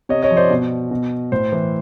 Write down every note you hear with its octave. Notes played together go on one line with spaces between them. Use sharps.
C3 C#5 D#5
C#5 D#5
F3
C5 D5
B2
B2
A2 C5
E3